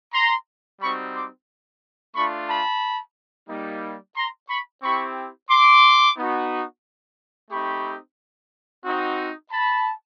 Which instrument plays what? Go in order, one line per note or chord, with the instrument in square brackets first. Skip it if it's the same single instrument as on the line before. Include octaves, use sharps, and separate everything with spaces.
[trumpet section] A#5 C6
G3 C4 D#4 F#4 B5 C#6
C6 D6
A3 D4 F4 B5 C#6
A5 B5
G3 A#3 D#4
A#5 C6
B5 C#6
C4 E4 G4 B5 C#6
C6 D6
B3 D#4 F#4
A3 C4 D#4 G4 B5 C#6
C4 D#4 F#4
A5 B5